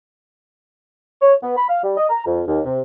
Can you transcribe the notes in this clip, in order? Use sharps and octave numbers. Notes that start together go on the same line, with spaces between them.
C#5
B3
B5
F5
G3
D#5
A#5
F2
D#2
C3